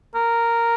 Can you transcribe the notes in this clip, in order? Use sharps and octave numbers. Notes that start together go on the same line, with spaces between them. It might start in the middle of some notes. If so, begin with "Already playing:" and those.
A#4